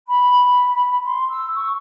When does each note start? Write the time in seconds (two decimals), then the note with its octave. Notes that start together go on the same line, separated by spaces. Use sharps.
0.07 B5
0.32 B5
1.03 C6
1.30 E6
1.55 C#6